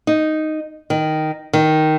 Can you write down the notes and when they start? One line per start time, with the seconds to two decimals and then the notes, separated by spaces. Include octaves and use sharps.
0.07 D#4
0.90 D#3
1.53 D#3